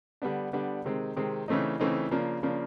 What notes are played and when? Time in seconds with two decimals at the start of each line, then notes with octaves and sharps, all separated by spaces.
0.22 D3 G3 B3 D4
0.53 D3 G3 B3 D4
0.85 C3 D#3 G#3 C4
1.16 C3 D#3 G#3 C4
1.48 C#3 E3 A3 C4 D#4
1.80 C#3 E3 A3 C4 D#4
2.11 C#3 F3 A#3 D4
2.43 C#3 F3 A#3 D4